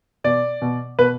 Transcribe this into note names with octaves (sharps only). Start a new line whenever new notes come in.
B2 D5
B2
B2 B4